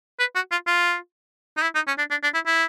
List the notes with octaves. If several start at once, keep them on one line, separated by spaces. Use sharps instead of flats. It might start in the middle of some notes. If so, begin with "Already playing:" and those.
B4
F#4
F4
F4
D#4
E4
D#4
C#4
D4
D4
D4
E4
E4